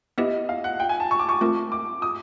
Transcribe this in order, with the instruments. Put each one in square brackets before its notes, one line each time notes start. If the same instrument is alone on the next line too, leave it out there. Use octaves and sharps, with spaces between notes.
[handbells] B3 E4 G4 B4 E5 [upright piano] D#5
[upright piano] F5
F#5
G5
G#5
A5
C#6
D6
C#6
[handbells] A3 C4 F4 A#4
[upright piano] D6
D#6